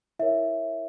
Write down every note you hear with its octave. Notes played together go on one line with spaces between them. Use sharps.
E4 A#4 C#5 E5